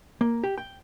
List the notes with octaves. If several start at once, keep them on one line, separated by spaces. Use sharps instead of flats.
A#3
G4
G5